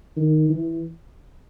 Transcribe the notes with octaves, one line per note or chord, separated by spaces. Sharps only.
D#3
E3